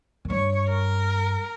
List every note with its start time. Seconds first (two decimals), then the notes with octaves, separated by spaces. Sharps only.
0.25 F#2
0.30 G2 C#5
0.69 A#4